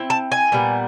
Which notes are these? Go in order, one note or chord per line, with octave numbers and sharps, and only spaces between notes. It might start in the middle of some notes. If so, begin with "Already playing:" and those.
Already playing: C4 E4
A5
G#5
A#2 G3 B3